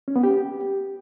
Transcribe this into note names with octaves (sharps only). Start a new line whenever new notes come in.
C#4
B3
G4